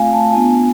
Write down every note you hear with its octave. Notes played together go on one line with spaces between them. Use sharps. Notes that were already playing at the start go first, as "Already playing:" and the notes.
Already playing: A3 C4 F4 F5 G#5
A5
B3 D4 F4 G#5